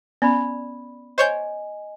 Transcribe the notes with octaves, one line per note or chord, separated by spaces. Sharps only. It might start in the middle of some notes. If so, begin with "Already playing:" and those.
B3 C#4 D5 B5
C5 C#5 D#5 G#5 G6